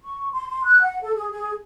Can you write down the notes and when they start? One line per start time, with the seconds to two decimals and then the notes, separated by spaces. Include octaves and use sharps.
0.01 C#6
0.32 C6
0.49 C6
0.65 F#6
0.82 F#5
1.02 A4
1.15 G#4
1.31 G#4